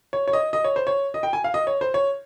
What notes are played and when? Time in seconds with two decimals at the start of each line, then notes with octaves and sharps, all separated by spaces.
0.13 C#5
0.28 C#5
0.33 D#5
0.53 D#5
0.64 C#5
0.76 C5
0.87 C#5
1.14 D#5
1.23 G5
1.33 G#5
1.44 F5
1.54 D#5
1.67 C#5
1.81 C5
1.94 C#5